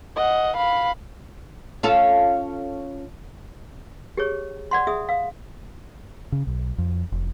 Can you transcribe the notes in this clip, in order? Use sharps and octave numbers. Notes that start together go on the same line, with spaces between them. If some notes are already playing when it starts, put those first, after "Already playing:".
D#5 F#5
F5 B5
C#4 F4 A4
G4 G#4 C#5
D5 F#5 C6
G#4 E5 D#6
F5
C#3
B1
F2
F1